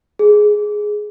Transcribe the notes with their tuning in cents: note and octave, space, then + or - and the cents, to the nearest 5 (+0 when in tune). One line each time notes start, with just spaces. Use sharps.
G#4 +5